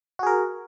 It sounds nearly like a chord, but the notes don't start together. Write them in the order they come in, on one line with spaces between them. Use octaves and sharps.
F#4 G#4 A#4